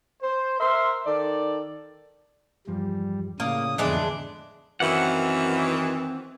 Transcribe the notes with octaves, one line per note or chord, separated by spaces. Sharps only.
C5
A#4 C5 E5 C6
D#3 A4 D5
E2 G2 F3 G3
A2 C#3 A#3 D5 F5 D#6
F2 D3 E3 G#3 B3 D4
F#2 D#3 E3 C4 F#5